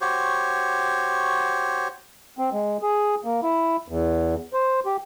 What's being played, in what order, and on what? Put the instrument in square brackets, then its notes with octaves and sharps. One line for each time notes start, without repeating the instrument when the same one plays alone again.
[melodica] F#4 G4 C5 C#5
[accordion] C4
G#3
G#4
A#3
E4
E2
C5
G4